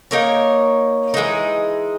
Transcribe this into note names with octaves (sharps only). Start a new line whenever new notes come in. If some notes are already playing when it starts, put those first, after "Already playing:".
A#3 D#4 A#4 C#5
E3 G#3 D#4